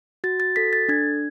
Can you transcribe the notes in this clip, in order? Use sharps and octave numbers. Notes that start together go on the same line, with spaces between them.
F#4 A6
A6
A4 B6
A6
D4 G#6